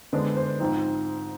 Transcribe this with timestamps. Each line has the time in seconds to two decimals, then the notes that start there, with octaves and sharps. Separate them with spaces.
0.13 D3 G#3 B3 D4 C5
0.37 C5
0.60 G#2 F3 C4 D#4